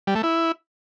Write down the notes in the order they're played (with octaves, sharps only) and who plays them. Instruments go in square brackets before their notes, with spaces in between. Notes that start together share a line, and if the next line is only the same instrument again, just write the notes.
[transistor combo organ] G3
A3
E4